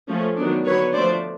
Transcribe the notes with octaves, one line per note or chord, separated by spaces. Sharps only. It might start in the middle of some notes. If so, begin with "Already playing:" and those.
F3 A3 C#4
D#3 F#3 B3 D4
D3 F#3 B3 B4 C#5
F3 A3 D4 C5 D5